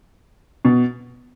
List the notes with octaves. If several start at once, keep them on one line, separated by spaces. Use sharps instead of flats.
B2